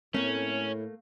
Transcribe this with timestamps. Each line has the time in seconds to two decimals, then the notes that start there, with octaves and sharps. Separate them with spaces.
0.14 A2 A3 A#3 C4 C#4